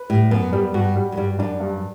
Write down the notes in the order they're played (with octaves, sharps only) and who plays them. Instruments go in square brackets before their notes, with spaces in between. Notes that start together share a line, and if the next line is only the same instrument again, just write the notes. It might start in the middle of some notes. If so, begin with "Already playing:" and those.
Already playing: [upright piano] B4
[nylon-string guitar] A2 [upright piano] G3
[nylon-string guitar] F#2 [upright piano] B3
[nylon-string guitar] F#2 [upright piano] G3
[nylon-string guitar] G2 [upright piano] F#4
[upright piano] G3
[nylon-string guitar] F#2
[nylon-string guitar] G2 [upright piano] G3
[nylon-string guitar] F#2 [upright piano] D4
[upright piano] G2